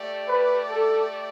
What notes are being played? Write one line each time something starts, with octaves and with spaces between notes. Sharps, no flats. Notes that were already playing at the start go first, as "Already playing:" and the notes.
Already playing: A3 G4 D5
B4
A4